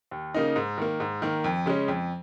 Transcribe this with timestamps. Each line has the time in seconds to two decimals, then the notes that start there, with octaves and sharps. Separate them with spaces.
0.11 D#2
0.34 C#3 A#3 D#4
0.56 G#2
0.78 D#3 A#3
1.00 G#2
1.22 D#3 A#3
1.44 F2
1.66 C#3 G#3 C#4
1.88 F2